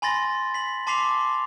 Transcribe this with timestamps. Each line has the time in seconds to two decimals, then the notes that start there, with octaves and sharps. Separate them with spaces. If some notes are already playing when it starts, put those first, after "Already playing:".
0.02 G#5 B5 C6 A6 A#6
0.54 B6 F#7
0.87 A5 C6 D6 B6 C7 F7